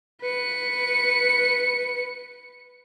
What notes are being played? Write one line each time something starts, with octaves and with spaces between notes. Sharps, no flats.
B4 C#7